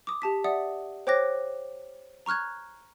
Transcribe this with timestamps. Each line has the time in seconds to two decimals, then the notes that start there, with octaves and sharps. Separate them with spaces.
0.07 D6 D#6
0.22 G4 A5 B6
0.44 D5 E5 F#5 D#6
1.07 C5 C#5 G5 D6 F#6 A#6
2.26 A#5 C#6 F6 F#6 G#6